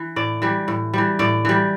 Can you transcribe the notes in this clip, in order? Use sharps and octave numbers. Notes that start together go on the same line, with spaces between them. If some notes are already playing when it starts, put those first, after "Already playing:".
Already playing: E3
A2 D5
E3 G3
A2
E3 G3
A2 D5
E3 G3